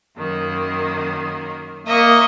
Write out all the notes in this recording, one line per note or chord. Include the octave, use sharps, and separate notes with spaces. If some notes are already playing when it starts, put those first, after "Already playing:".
F#2 D#3 A#3
A#3 D#5 E5 C#6